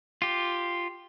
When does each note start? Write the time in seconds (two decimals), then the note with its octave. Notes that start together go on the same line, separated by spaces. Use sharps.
0.22 F4 G4